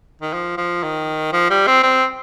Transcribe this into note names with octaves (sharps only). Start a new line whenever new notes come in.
D#3
F3
F3
D#3
F3
G3
C4
C4